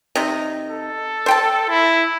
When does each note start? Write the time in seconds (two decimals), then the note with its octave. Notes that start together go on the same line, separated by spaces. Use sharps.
0.15 C3 D#4
0.69 A4
1.26 C5 G5 A5
1.69 E4